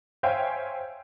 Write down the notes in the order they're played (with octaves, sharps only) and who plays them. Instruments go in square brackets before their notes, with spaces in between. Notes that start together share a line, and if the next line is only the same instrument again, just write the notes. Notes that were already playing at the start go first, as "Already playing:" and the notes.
[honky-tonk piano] C5 C#5 E5 F5 G5 G#5